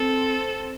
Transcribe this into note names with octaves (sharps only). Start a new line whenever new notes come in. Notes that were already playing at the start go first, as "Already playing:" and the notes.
Already playing: C4 A4